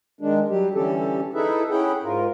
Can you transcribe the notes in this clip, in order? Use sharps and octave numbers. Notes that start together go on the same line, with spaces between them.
D#3 G#3 D4
F#3 G3 G4
D3 E3 G3 C#4 G4 A4
D#4 E4 G#4 A4 B4 E5
C#4 E4 G#4 F#5 G5
G#2 F4 A#4